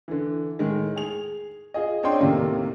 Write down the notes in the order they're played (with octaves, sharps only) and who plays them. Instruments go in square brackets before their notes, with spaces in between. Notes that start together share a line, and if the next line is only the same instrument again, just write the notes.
[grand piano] D3 E3
A2 D#3 G#3
G#4 F7
F4 G#4 D#5
C4 D4 C#5 D#5 G5 C6
D#2 A2 C3 D#3 A#3